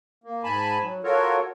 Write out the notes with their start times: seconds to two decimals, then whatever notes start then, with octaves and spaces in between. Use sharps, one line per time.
0.24 A#3
0.44 G#2 G#5 A5 B5
0.82 F#3
1.04 F4 F#4 A4 A#4 C#5